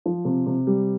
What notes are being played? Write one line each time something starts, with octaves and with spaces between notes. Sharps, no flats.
F3
C3
C3
G3